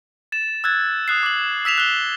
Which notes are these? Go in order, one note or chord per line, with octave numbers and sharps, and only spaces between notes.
A6 E7
E6 F#6 G#6 A6
D#6 F#6 C7
D6 F#7
E6 B6 E7 F7
F#6 G7